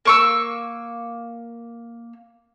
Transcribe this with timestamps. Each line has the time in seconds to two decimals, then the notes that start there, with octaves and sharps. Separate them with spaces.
0.05 A#3 C#6 E6